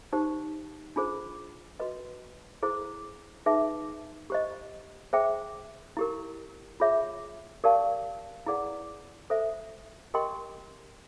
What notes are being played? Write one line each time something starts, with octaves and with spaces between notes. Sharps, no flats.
D#4 G4 C5
D4 F4 G#4 C5
F#4 B4 D#5
E4 G#4 C5
D#4 G#4 B4 E5
G4 C5 D#5
G#4 C5 E5 G5
E4 G4 A#4
F4 G#4 C#5 E5
G4 A#4 D5 F5 A5
E4 G#4 B4 D5 F#5
A4 C5 E5
G4 A#4 D#5 G5 C6